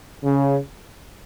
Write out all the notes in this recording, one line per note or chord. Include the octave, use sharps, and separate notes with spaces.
C#3